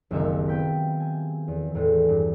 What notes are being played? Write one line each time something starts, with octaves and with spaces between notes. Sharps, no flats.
F#1 C2 D#3 F#3 E5 F5
B3 G5 B6
G#5
E2
E2 A2 G#3 A3
G2